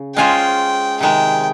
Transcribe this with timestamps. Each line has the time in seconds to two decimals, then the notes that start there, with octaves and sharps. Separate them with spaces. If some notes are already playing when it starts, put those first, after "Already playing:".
Already playing: C#3
0.16 G#3 C#4 F4 G#4 C5 G5
1.00 C3 D#3 G#3 G5